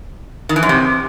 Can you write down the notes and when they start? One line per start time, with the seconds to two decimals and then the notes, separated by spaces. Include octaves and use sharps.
0.49 D#3
0.56 E3
0.63 F#2
0.69 C3